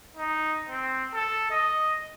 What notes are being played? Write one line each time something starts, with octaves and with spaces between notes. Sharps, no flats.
D#4
C4
A4
D#5